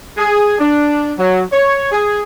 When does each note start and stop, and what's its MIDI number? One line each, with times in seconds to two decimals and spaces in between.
0.18 0.58 68
0.59 1.12 62
1.19 1.43 54
1.52 1.88 73
1.92 2.21 68